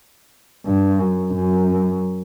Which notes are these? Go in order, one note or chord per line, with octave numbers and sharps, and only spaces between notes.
G2
F#2
F#2